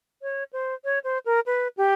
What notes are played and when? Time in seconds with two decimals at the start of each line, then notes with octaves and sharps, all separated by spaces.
0.22 C#5
0.53 C5
0.84 C#5
1.04 C5
1.26 A#4
1.46 B4
1.77 G4